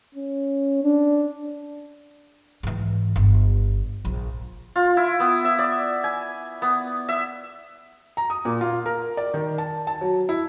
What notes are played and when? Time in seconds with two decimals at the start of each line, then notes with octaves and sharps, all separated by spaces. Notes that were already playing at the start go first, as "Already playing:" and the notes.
0.15 C#4
0.84 D4
2.63 G#2 E3
3.16 G1
4.05 A#1
4.76 F4
4.97 E4
5.20 B3
5.45 E5
5.59 D5
6.04 G#5
6.62 B3
7.09 E5
8.17 A#5
8.30 D#6
8.45 A#2
8.61 F4
8.86 A#4
9.17 D5
9.34 D#3
9.58 A5
9.87 A5
10.01 F#3
10.29 E4